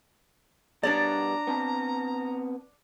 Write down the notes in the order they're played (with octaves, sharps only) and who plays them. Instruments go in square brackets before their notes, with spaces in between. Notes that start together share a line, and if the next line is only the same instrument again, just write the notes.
[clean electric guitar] B2 G3 B3 [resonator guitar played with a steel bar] D4 C#5 D5 [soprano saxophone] A#5
[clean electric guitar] B3 C4 A5